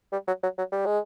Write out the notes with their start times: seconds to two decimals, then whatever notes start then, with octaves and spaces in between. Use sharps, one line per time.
0.12 G3
0.27 F#3
0.43 F#3
0.58 F#3
0.72 G3
0.86 G#3